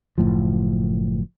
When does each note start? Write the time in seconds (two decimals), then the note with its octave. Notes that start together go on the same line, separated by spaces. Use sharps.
0.18 F#1 C2 A2 F3